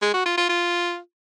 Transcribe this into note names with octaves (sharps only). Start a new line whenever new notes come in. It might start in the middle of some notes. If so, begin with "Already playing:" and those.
G#3
F#4
F4
F4
F4